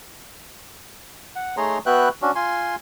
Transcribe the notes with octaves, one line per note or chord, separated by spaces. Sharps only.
F#5
A3 D#4 G#4 C#5 A#5 C6
B3 F#4 B4 E5 G5 F#6
C#4 D4 F#4
F4 G#5 C6